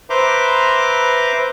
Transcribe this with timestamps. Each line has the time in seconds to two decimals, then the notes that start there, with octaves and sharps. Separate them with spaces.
0.10 B4 C5 E5 A#5 C6 D6